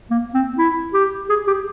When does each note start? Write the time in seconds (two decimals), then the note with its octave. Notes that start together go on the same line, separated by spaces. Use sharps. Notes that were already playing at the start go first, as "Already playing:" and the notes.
0.10 A#3
0.34 C4
0.58 E4
0.93 G4
1.30 G#4
1.47 G4